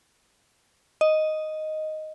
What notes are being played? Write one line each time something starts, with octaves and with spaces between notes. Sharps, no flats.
D#5